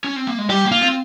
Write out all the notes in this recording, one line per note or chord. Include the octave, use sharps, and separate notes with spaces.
C#4
C4
A#3
G#3
G3 G4
A#3
F4
C4